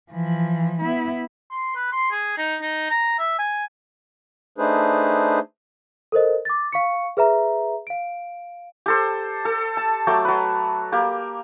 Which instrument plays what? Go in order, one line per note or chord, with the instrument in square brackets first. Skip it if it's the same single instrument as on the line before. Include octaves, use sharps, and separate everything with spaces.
[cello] E3 F3
B3 E4
[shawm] C6
B4
C6
G#4
D#4
D#4
A#5
E5
G#5
[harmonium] A3 D4 D#4 G#4 B4 C5
[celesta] A4 A#4 C5 D#5
D6 A6
F5 C#6 C#7
G#4 B4 E5 A#5
F5 D7
[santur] G4 A4 C5
A4
A5
F#3 A3 G5 D6
F#3 B4
A#3 G4